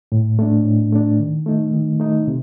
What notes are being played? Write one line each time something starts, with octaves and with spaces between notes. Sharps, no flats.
A2
A3 D4
A2
A3 D4
D#3
A3 D#4
D#3
A3 D#4
C3